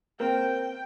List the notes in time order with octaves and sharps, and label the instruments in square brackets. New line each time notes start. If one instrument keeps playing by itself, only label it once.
[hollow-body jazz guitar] A#3 C4 [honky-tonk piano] A#4 [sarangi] G5